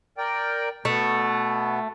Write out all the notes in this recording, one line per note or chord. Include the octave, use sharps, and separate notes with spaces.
A#4 D5 G5
B2 A3 B3